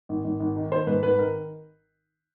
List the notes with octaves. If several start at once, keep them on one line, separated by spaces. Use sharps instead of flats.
G#1
G#1
G#1
D#3
D#3 C5
G#2 B4
G#1 B4
D#3 A#4